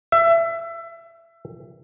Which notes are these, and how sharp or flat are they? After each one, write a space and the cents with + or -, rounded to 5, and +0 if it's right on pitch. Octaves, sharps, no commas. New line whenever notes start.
E5 +25